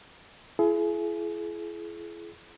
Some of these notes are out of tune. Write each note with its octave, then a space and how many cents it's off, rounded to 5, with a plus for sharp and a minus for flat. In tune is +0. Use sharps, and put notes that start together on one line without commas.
E4 +40 G#4 +35